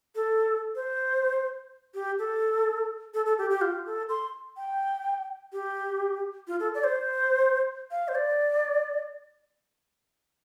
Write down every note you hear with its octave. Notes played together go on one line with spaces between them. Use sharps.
A4
C5
G4
A4
A4
A4
G4
G4
F4
A4
C6
G5
G4
F4
A4
D5
C5
F5
C5
D5